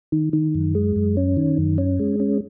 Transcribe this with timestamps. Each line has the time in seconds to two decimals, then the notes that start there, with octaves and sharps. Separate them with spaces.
0.12 D#3
0.33 D#3
0.55 F#2
0.75 G#3
0.96 F#2
1.17 C#4
1.37 D#3
1.58 F#2
1.78 C#4
1.99 G#3
2.20 C#4